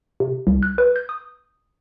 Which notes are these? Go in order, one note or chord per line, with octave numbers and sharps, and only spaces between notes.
C3
C2
F#6
B4
G6
D#6